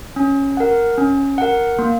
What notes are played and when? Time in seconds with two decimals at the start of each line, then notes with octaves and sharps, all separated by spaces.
0.16 C#4
0.57 A#4 F#5
0.98 C#4
1.38 A#4 F#5
1.79 A#3